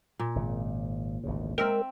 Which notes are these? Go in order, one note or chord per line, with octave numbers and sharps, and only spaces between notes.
A#2
G#1 C#3
G#1 D2 C#3
G#3 C4 A#4 E5 G5